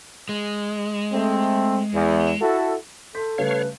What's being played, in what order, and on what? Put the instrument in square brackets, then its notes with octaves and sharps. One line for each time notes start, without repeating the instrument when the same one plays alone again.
[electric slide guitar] G#3
[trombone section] A3 C4
E2
E4 F#4 A4
[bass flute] A4 [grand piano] C6 G6 B6
[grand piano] C#3 G3 A3 [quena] B4 [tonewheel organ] C#5 F5